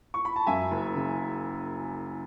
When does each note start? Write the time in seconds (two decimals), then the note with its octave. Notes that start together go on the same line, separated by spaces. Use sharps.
0.14 C#6
0.25 B5
0.36 A5
0.46 F#2 E5 G#5
0.71 F#1
0.95 C#3